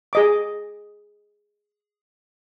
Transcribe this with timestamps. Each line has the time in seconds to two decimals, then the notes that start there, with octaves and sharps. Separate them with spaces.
0.13 G#4 D#5 D6